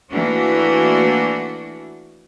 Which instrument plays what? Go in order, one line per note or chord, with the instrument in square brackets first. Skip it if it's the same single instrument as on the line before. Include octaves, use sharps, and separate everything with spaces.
[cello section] E3 A3 A#3 D4 F#4